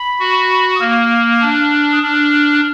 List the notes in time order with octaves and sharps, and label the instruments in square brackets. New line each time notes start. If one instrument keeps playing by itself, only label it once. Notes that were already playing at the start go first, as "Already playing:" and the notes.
Already playing: [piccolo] B5
[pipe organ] F#4
[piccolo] D#6
[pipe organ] A#3 [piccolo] F6
[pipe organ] D4
[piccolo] D#6
[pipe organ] D4 [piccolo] F6